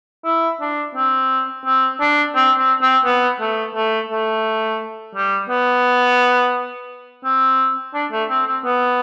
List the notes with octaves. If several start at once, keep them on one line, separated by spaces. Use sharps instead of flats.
E4
D4
C4
C4
D4
C4
C4
C4
B3
A3
A3
A3
G3
B3
C4
D4
A3
C4
C4
B3